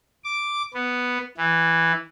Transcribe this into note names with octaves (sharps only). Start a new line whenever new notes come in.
D6
B3
E3